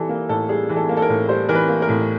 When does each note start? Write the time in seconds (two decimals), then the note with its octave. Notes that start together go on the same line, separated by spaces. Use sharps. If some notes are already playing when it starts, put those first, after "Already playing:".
Already playing: E3 G3 A4
0.09 A#3
0.29 A2 A4
0.49 G3 G#4
0.69 E3
0.76 A4
0.89 A#3
0.97 A4
1.02 A#4
1.09 A2
1.29 G3 C5
1.49 E3 A#4
1.55 B4
1.68 A#3
1.82 A#4
1.88 A2